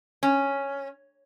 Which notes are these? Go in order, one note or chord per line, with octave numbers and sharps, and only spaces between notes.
C#4